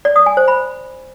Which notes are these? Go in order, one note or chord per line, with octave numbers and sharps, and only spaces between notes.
D5
D#6
G#5
C5
B5